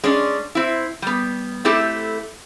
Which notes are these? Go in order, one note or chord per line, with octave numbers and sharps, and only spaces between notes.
G#3 C#4 D4
C4 E4
G3 B3
A3 C4 E4 G4 A4